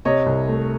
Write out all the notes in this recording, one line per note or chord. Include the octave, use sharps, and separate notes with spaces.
C3 C#5 D#5
C2
A3